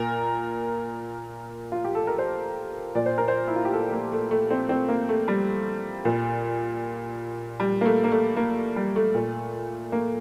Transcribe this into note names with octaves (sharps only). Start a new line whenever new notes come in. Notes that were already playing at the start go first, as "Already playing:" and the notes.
Already playing: A#2 A#4
F4
G4
A4
A#4
C5
A#2 D5
C5
A#4
C5
E4
F4
G4
A4
A#3
A3
A3
C4
C4
A#3
A3
G3
A#2
G3
A#3
A3
A#3
A3
A#3
G3
A3
A#2
A#3